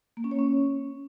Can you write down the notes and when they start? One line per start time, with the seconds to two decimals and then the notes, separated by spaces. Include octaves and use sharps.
0.17 A#3
0.24 C#4
0.31 C#5
0.39 C#4